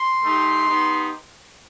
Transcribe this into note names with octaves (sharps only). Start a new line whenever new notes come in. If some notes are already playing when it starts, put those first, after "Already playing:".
Already playing: C6
A3 D#4 G4
B3 D#4 G4